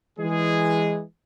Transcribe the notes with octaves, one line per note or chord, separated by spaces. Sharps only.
E3 G#3 G#4